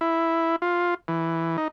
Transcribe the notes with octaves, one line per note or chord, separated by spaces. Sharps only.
E4
F4
E3
D#4